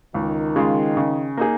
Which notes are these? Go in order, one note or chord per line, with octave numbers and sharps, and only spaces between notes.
C#2 D#3
C#3 G#3 F4
C#3
A#3 D#4 G#4